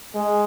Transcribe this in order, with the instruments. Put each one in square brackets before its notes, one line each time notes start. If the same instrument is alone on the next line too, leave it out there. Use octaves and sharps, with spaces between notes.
[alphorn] G#3